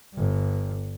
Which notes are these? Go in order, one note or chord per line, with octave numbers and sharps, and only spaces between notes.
G1 G2